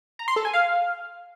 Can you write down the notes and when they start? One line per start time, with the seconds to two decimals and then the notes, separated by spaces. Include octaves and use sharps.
0.19 A#5
0.28 C6
0.36 A4
0.45 G#5
0.53 F5